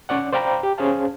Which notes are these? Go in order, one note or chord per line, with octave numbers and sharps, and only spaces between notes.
C#4 C#5 D5 F#5
C5 D5 F5 G5 A#5 B5
G4
C#4 G#4 C5 F5 A5